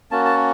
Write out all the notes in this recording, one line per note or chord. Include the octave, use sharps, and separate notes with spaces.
A#3 C#4 F#4 A5
A5